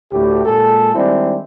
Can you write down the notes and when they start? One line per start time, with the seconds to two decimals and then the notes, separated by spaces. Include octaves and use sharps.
0.12 D2 A2 G4
0.45 A#2 G#3 G#4 A4
0.94 D#3 G3 G#3 C4 D4 E4